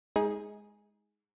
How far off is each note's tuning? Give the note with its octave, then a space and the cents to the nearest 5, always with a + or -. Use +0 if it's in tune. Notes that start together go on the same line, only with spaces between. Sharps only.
G#3 +0 D#4 +30 G#4 +0